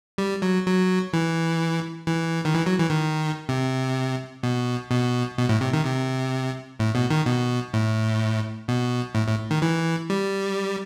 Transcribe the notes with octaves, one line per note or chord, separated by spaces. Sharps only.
G3
F#3
F#3
E3
E3
D#3
E3
F#3
E3
D#3
C3
B2
B2
B2
A2
C3
D#3
C3
A2
B2
D#3
B2
A2
B2
A2
A2
D#3
E3
G3